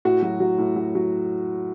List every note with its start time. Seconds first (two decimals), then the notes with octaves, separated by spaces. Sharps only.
0.05 A2 F#4
0.22 F#3
0.40 F#3
0.58 A2
0.76 F#3
0.95 F#3